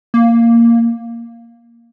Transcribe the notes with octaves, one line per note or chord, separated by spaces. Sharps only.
A#3